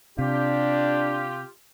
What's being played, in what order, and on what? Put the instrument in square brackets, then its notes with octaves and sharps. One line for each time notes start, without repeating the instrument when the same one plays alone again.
[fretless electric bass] C3 [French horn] D4 [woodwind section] F4 G4